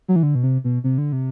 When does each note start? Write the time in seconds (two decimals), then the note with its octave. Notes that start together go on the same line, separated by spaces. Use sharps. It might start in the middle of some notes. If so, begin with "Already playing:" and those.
0.08 F#3
0.16 E3
0.23 D3
0.35 B2
0.44 C3
0.64 B2
0.84 C3
0.98 D3
1.12 C3